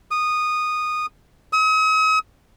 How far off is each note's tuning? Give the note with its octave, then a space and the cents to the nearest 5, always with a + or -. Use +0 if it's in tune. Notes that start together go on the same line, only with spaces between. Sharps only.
D#6 -15
D#6 +45